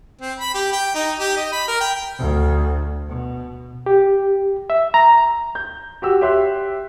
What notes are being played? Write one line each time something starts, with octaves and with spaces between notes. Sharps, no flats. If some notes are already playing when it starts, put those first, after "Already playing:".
C4
B5
G4
G5
D#4
G4
D#5
B5
A#4
G5
D2
B2
G4
E5
A#5
G6
F#4 G4 E6
G4 C#5 E5 C6 F#6